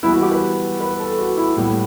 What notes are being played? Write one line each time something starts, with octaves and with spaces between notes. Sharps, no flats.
E3 G3 B3 E4
F#4
G4
B4
B4
A4
F#4
E4
A2 G3 B3